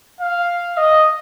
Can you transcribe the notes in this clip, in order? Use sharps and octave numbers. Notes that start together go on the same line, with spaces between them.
F5
D#5